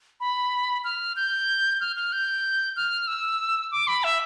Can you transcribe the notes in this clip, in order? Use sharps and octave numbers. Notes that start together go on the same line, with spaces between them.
B5
F6
G6
F6
F6
G6
F6
E6
D6
B5
E5